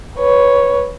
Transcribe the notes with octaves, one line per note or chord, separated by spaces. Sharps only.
B4 C#5